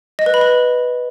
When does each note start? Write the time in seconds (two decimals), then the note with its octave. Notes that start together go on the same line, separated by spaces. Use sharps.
0.19 D#5
0.26 B4
0.34 B5
0.41 B4